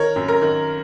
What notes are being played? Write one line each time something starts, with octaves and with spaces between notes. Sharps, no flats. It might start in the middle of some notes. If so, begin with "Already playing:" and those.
Already playing: D#3 A#4 C#5
F#2
A#4
D#3